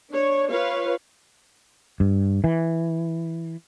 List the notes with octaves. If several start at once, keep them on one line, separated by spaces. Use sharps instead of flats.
D4 C#5
F4 B4 C#5 F5
G2
E3